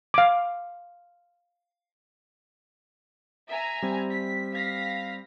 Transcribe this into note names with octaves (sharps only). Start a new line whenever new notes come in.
F5 D6
E5 G#5 A#5
G3 C4
B6
F5 A#6 B6